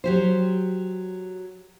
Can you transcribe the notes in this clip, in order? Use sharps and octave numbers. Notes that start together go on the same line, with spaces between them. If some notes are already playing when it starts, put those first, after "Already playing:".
F#3 G4 C5